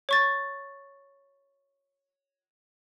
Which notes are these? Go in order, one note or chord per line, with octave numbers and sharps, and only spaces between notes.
C#5 C#6 A6